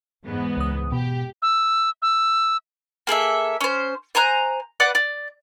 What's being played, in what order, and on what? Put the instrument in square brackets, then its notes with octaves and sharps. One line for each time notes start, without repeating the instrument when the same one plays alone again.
[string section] E2 G#2 B3
[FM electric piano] C#2 D#6
[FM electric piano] B2 [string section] G4
[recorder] E6
E6
[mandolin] A#3 G#4 A4 E5
C#4 C5
C5 G#5 A#5 F#6
B4 D5 F#5 D6
D5